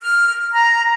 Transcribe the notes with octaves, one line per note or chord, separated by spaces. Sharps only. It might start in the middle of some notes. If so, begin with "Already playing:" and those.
F6
A#5